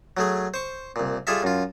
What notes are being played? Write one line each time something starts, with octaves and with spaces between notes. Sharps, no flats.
F#3 A3 G#4
C5 C#6
C2 A#2
G3 F4 G#4 A4 E5
F#2 F4